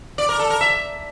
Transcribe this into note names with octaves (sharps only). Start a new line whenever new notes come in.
D5
A#4
A4
A#4
E5